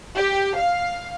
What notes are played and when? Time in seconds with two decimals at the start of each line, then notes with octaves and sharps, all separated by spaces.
0.15 G4
0.58 F5